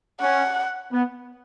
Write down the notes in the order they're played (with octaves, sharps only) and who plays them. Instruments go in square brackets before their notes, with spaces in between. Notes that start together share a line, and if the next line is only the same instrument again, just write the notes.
[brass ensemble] C#4 [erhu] F#5
[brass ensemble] B3